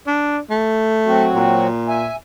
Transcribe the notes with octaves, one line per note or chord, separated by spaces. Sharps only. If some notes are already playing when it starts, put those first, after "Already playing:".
D4
A3
F#3 C4 F#4
A#2
E5 G#5